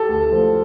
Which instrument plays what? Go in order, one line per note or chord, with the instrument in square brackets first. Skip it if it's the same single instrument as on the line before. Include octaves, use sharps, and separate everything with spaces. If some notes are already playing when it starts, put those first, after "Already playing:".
Already playing: [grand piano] G4 [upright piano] A4
[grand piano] D2
F3